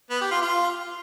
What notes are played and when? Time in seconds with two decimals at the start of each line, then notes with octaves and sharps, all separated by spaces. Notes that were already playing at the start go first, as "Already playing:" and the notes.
0.10 B3
0.21 G4
0.31 F4
0.41 F4